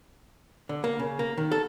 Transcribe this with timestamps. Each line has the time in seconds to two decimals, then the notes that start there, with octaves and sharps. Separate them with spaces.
0.69 D3
0.84 A#3
0.99 C#3
1.19 A#3
1.38 D#3
1.52 A4